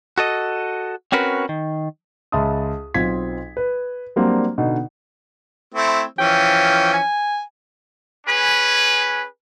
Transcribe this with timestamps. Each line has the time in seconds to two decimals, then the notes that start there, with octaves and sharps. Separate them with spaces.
0.18 F#4 A4 D#5
1.12 C4 C#4 F#4 A#4 B4
1.49 D#3
2.32 C#2 E5 A5 C6 D#6
2.94 B1 C4 F4 G#6 B6
3.57 B4
4.16 F#3 G3 A#3 C4 D4
4.58 B2 D3 D#4
5.74 A3 C4 E4
6.19 E3 F3 C#4 G5
6.94 G#5
8.27 C#4 G#4 B4